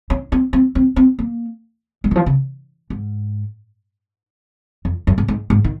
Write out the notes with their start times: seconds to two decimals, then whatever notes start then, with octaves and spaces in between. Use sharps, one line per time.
0.10 C#4
0.32 C4
0.53 C4
0.75 C4
0.96 C4
1.19 A#3
2.04 G#3
2.11 D#3
2.16 F3
2.26 C#3
2.90 G#2
4.85 F2
5.07 F#2
5.18 G#2
5.28 G#2
5.50 G#2
5.64 D#3